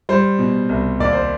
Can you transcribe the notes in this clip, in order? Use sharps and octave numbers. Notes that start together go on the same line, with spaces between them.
G3 C5
B2
C2
D#2 D5
C5